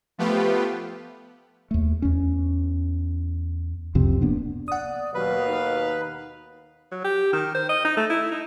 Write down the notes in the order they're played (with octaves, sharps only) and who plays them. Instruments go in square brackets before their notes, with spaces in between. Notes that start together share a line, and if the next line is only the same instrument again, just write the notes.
[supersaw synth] F3 A3 B3 F4 G4 B4
[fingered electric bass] D#2 A3
E2 C#4
C2 F2 C3 C4
D1 A#3 B3 D4
[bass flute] D5 [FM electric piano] F#5 D#6
[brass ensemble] D#2 B2 F5 [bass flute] F#3 [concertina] B4
[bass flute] D#4
[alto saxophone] F#3
G4
D#3
C5
D#5
D#4
A3
E4
D#4